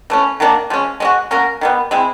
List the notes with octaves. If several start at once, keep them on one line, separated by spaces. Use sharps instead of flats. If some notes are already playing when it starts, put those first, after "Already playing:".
E3 A3 C#4
D#3 F#3 A#3 D4
F3 G#3 C#4
G#3 C#4 F#4
A#3 C#4 F#4 A#4
D#3 G3 B3
G#3 C4 E4